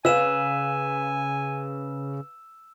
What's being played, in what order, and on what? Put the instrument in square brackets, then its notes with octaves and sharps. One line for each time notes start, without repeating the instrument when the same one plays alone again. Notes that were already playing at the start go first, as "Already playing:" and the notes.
[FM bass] C#3 [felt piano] B4 F5 [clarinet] G#5 [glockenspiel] E6 E7